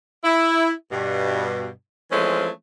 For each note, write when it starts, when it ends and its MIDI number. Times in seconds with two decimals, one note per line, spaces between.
0.24 0.71 64
0.91 1.68 43
0.91 1.68 47
2.11 2.49 52
2.11 2.49 53
2.11 2.49 56
2.11 2.49 57
2.11 2.49 60
2.11 2.49 61